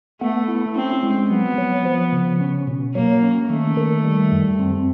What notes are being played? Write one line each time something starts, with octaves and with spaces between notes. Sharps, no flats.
A3 B3
E4
C4 C#4
G#3
F#3 B3
F#3
F3
C#3
C#4
B2
F#3 A#3
C#4
D#3 A3
D#3
G3
F#2
C4